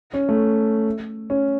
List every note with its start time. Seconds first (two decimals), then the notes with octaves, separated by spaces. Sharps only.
0.14 C#4
0.29 A3
1.30 C#4